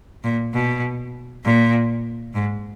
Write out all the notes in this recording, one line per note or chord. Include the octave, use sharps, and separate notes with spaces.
A#2
B2
A#2
G#2